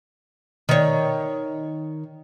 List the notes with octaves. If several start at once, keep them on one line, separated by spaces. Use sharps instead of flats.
D#3 C#5